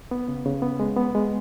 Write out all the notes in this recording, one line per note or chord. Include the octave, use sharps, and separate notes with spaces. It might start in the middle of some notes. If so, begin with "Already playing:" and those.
B3
C#3
C#3
B3
G#3
B3
G#3